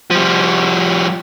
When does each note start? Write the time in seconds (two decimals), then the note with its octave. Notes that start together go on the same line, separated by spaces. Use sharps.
0.11 F3 G3